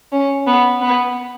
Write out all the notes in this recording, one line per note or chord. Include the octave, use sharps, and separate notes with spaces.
C#4
B3
B3